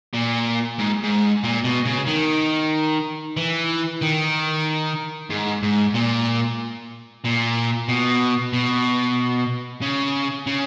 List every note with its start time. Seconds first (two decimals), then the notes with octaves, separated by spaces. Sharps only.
0.14 A#2
0.78 G#2
1.03 G#2
1.44 A#2
1.65 B2
1.86 C#3
2.07 D#3
3.37 E3
4.02 D#3
5.30 G#2
5.63 G#2
5.94 A#2
7.24 A#2
7.88 B2
8.53 B2
9.81 C#3
10.46 C#3